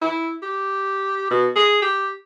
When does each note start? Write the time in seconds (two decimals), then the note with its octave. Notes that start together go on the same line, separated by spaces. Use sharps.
0.01 E4
0.43 G4
1.30 B2
1.56 G#4
1.82 G4